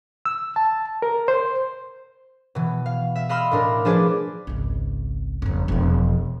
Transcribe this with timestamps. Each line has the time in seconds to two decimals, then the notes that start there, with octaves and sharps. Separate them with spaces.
0.25 E6
0.56 A5
1.02 A#4
1.28 C5
2.55 B2 E3
2.86 F5
3.16 E5
3.29 D#5 F5 B5 C6 E6 F6
3.51 A2 D4 A#4
3.85 F3 D4 G#4 B4 C5 D5
4.47 G#1 C#2
5.42 F#1 F2
5.68 E1 F3